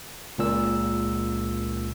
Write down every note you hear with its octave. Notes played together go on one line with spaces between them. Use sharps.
C#2 A#2 E6